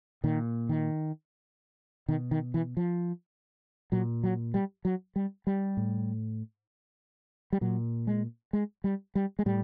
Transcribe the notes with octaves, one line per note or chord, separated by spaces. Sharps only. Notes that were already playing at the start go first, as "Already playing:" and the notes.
A#2 D#3
D#3
B2 D#3
D#3
E3
F3
A#2 F#3
F#3
G3
F#3
G3
G3
A2
G3
A#2 F#3
G#3
G#3
G3
G3
G#3
A2 G3